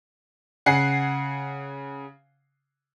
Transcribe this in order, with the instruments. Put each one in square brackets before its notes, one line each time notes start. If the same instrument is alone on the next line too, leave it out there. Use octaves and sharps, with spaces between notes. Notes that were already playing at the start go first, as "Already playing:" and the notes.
[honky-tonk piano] C#3 F#5 G#5 C7